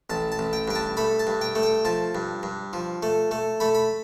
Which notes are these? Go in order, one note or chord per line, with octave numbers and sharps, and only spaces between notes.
A1 A5
A5
A1
G5
G2 G5
A5
A3 B5
A5
G2
G5
A3
G5
F3 A5
G2
G2
F3
A3
A3
A3 B5
B5